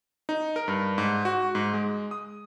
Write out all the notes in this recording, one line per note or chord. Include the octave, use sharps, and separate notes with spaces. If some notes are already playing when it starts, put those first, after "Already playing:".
D#4
A#4
G2
G#2
F#4
G#2
G#3
D#6